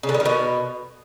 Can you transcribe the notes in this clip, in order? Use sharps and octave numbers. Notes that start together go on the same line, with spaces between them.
C#3
D3
G3
D#3
B2